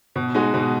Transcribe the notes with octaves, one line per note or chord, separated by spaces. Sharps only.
B2
G#3 D#4 F#4
B2